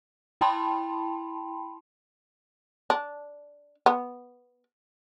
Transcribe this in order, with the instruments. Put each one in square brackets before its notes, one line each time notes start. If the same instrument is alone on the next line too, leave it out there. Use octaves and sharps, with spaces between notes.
[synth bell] E4 G5 A5 B5 C6
[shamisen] D4
B3